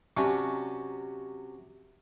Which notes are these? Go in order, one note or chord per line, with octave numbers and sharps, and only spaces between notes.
C3 F#3 C#4 D4